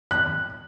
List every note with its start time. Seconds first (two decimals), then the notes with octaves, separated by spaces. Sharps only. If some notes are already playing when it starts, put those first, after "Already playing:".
0.11 F#6